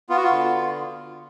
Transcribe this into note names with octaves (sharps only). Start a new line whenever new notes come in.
B3 F4
F#4
F4
D3